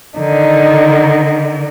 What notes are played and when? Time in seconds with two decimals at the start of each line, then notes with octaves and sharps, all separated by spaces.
0.18 D3 D#3 D#4